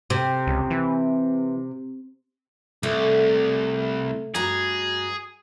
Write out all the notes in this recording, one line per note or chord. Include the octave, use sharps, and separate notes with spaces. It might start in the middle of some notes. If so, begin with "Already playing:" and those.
C3
C#2
E3
C2 A3
G2 F#4 G#4 A#5